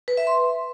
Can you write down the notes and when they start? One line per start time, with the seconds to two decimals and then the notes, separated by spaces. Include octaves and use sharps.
0.08 B4
0.17 E5
0.27 C6